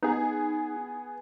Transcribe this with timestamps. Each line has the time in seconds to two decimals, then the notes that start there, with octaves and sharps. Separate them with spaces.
0.03 B3 D#4 G#4